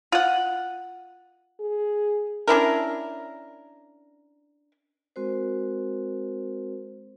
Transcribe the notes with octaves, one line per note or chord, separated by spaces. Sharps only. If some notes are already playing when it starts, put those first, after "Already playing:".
F4 F#5
G#4
C#4 D4 E4 A#4
G#3 C4 F#4 A#4 C5